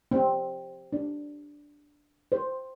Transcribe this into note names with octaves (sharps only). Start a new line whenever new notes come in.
C4
D4
C5